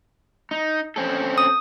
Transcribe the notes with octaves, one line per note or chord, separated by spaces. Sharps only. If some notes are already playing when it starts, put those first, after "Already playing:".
D#4
C4 C#4 A4
D#6